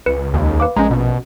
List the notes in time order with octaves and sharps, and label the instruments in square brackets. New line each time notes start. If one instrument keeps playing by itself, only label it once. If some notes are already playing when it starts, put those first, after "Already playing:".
[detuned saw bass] C#2 [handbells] B4 C#7
[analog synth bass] D#2
[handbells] B4 F5 D6
[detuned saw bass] A#1 [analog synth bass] G#3 [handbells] C#4 D#5 A#5
[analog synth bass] B2